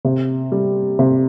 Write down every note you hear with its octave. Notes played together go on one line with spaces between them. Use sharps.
C3
G3
C3